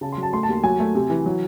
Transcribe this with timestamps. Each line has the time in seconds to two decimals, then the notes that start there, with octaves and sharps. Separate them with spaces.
0.01 C#3 A5
0.12 F#3 C6
0.23 A5
0.33 A3 C6
0.43 A5
0.49 D#2
0.64 F#3 G#5
0.80 A3
0.95 C3
1.10 E3
1.26 F#3